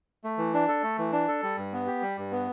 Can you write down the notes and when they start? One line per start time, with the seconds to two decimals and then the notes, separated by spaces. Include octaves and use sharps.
0.24 A3
0.38 E3
0.54 D4
0.68 A4
0.83 A3
0.98 E3
1.12 D4
1.28 A4
1.43 G3
1.58 G2
1.72 B3
1.87 G4
2.02 G3
2.18 G2
2.31 B3